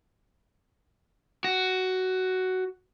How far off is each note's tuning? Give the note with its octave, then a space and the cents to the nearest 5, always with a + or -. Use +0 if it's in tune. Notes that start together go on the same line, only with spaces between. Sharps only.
F#4 +10